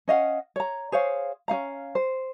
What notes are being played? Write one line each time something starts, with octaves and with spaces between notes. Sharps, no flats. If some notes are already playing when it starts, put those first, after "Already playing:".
C#4 D#5 F5 F#5
C#5 A#5
G#4 C5 C#5 F5
C#4 D#4 F5 A#5
C5